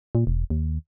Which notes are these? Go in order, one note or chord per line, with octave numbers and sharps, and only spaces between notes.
A#2
E1
D#2